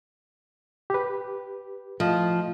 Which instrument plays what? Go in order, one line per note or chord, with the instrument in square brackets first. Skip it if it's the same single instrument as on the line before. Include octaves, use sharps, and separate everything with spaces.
[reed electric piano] G4 B4
[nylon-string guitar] F3 [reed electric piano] A3 D#5